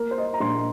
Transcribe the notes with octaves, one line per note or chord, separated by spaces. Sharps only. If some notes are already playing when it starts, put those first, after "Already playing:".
Already playing: A#3 A#4
C5
D#5
A#5
A#1 C6